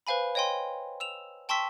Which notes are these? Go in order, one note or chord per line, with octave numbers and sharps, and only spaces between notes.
B4 C5 F5 G#5 B5
C#5 D#5 G5 G#5 C6
E6 E7 F7
G5 A5 C6 C#6 E6 B6